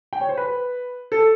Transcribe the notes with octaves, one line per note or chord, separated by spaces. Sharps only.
G5
C#5
C5
B4
A4